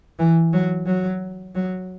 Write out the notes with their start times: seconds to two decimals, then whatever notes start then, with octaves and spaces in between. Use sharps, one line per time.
0.19 E3
0.53 F#3
0.86 F#3
1.55 F#3